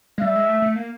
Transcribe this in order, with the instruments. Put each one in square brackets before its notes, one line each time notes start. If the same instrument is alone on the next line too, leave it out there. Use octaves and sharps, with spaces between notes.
[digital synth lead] G#3
[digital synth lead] G3 [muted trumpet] E5
[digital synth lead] G#3
A3
A3
A#3